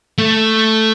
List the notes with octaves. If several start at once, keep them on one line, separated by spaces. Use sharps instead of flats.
A3